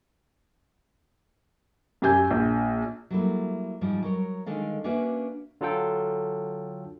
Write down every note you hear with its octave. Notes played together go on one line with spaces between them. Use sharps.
F#2 G4 G#5 G6
A#1
F#3 G3 A3 A#3 E4
G#2 F3 G3
F#3 A#4 C#5
D3 D#3 G#3 A4 F5
A#3 C#4 D4 F#4 B4 E5
D3 F#3 F4 A4 G5